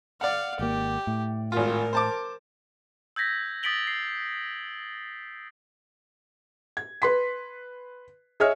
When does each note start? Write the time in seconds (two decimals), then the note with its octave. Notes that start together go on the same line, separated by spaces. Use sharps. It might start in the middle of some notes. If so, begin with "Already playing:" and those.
0.21 D5 F5 F#5
0.59 G#1 A#3 G4
1.07 A2
1.52 G#1 F4 A#4
1.93 C5 A5 D6
3.16 E6 G6 G#6 A#6 B6
3.63 D#6 A6 B6 D7 F#7 G7
3.87 C7
6.77 G#6
7.02 B4 C6 B6
8.40 G#4 C#5 D#5 E5 F6